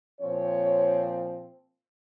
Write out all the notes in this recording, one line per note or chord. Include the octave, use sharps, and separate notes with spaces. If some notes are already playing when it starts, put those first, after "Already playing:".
A#2 F3 C4 C#5